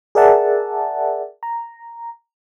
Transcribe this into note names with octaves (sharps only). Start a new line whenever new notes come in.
G#4 A#4 D5 E5 F#5 A5
A#5